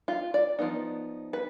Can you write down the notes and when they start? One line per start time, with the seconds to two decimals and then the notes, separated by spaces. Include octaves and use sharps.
0.08 F4
0.34 D5
0.59 F3 B3 D#4
1.33 B4